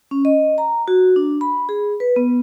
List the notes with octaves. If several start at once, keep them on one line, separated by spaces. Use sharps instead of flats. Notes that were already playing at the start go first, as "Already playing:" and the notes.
C#4
D#5
A#5
F#4
D4
B5
G#4
B4
B3